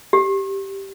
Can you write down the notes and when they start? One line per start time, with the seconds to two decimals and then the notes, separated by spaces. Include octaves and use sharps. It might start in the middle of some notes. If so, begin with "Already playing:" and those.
0.13 G4